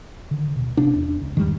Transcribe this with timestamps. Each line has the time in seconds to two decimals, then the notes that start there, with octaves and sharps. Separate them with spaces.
0.31 D3 D#3
0.56 D1 B2
0.77 C3 B3 C#4 D4
0.94 E2
1.21 C#2
1.37 E2 G#2 D#3 G3